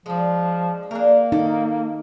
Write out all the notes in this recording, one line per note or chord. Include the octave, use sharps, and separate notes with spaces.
F3 G#3 D4
A#3 D4 G#4 A#4
D#4 A4